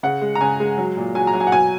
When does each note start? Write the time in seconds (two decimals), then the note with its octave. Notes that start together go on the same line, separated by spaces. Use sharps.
0.03 C#3 F#5
0.22 G#3
0.35 A#5
0.41 C#3 G#5
0.60 G#3
0.78 F#3
0.97 A#2
1.15 F#3 G#5
1.27 A#5
1.34 F#3
1.40 G#5
1.47 F#5
1.52 B2 G#5